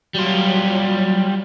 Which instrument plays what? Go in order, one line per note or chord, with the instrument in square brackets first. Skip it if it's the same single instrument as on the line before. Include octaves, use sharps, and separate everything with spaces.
[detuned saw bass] F#3 [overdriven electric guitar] G3 F4